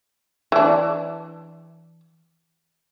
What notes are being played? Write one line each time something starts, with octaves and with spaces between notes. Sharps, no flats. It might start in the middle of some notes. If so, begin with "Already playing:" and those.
E3 D4